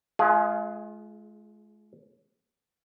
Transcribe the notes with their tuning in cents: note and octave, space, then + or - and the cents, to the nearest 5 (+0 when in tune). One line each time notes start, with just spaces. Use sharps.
G#3 +35 F4 -15 G#4 +0